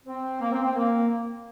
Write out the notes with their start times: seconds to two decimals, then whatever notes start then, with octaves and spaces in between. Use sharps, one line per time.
0.05 C4
0.39 A#3
0.51 C4
0.62 C4
0.75 A#3